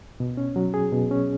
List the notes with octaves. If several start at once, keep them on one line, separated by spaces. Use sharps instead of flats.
B2
C#4
F#3
G#4
B2
C#4